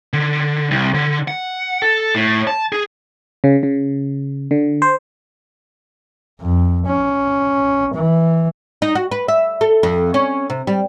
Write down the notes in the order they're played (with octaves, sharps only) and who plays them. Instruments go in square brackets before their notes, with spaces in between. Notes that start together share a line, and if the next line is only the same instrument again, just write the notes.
[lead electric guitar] D3
C2
D3
F#5
A4
A2
A5
G#4
[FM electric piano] C#3
C#3
D3
C5
[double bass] F2
C#4
E3
[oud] D#4
F#4
B4
E5
A4
F2
C#4
C3
G3